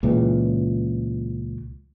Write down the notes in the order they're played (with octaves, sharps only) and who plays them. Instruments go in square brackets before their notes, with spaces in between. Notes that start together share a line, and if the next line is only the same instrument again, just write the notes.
[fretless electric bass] C#2 A#2 C#3 E3